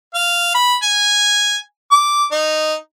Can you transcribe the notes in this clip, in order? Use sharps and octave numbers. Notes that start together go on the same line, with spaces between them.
F5
B5
G#5
D6
D#4